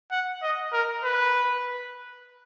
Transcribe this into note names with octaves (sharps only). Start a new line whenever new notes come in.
F#5
D#5
A#4
B4